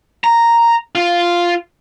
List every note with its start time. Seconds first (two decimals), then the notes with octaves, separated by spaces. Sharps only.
0.24 A#5
0.95 F4